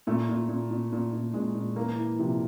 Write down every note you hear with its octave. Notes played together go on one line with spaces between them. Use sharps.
A#2 A3
A#2
A#2
A#2
A#2
A#2
A#2 G#3
A#2
E3 A#3
E3
C3 F3